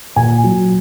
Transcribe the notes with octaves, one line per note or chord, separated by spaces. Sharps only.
A#2 G#5
F#3